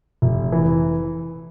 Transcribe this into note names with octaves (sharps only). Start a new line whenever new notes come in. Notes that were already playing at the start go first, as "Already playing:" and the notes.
F1
E3